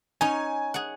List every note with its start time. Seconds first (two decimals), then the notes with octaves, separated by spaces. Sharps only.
0.21 C#4 D#4 G#5
0.74 G#4 F#5